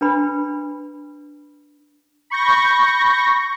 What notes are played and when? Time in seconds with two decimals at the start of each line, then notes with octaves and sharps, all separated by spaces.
0.01 D4 B4 B5
2.30 B5 C#6 G6 A#6